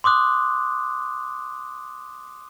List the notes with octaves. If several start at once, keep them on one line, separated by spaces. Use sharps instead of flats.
C6 D6 D#6 F#6